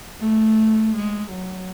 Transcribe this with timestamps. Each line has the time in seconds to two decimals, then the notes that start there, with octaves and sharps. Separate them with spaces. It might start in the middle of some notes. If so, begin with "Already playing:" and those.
0.20 A3
0.95 G#3
1.33 F#3